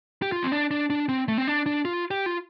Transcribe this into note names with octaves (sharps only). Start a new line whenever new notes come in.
G4
F4
C4
D4
D4
D4
C4
A3
C4
D4
D4
F4
G4
F4